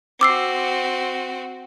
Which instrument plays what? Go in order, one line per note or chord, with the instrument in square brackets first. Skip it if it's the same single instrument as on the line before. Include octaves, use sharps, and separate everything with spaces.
[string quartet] C4 F#4 [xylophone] D6 E6 C7